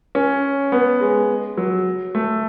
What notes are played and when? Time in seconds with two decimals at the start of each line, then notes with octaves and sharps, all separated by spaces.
0.15 C#4
0.72 B3
1.01 G#3
1.57 F#3
2.15 A3